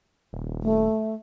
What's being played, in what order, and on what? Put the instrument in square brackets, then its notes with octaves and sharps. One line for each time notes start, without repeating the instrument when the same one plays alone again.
[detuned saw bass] D#1
[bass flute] A3